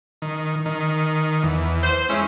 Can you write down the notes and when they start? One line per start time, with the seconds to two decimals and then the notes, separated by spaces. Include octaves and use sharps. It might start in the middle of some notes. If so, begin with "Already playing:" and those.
0.22 D#3
0.66 D#3
1.43 E2
1.83 C5
2.09 G#3 C#4 E4